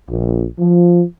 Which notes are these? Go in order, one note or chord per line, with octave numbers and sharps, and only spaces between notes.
A#1
F3